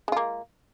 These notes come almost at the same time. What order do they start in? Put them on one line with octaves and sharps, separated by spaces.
G#3 F4 A#3